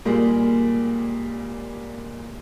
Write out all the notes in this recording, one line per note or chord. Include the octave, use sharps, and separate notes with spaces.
A#2 G3 G#3 A#3